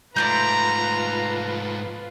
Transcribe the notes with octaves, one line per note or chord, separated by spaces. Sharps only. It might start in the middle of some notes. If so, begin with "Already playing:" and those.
G#2 A3 F4 B4 D5 A#5 C6 G6